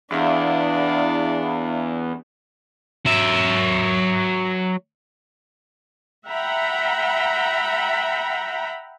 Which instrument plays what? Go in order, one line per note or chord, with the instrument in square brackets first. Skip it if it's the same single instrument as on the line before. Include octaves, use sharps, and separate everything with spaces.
[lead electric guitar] E2 [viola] D4 [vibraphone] E5 F5
[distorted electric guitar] F#3 E5
[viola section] E5 F#5 G5 A#5 B5